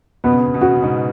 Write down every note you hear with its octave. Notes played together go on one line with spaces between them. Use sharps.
B2 B3
C#3
B2
C#3
B2
C#3 F#4
B2
C#3
G#2 B2